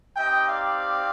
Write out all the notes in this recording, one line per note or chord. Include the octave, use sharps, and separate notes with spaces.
C4 D#4 G4 D#5 G5
D5 F5